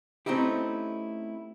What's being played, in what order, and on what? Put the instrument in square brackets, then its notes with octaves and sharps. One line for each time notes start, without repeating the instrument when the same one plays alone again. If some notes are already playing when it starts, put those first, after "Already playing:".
[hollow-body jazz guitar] A3 C4 C#4 D#4 E4 G4